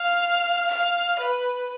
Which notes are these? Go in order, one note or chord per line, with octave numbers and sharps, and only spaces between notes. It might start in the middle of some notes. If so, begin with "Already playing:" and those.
Already playing: F5
F5
B4